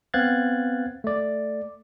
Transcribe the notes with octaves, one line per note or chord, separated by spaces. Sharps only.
B3 C4 F5 F#6 G#6 A6
A3 D5